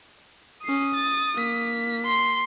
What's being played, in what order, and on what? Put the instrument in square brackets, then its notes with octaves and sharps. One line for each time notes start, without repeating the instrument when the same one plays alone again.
[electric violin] C#4 C7 [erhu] D#6
[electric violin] A6
A#3 B6
[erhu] C6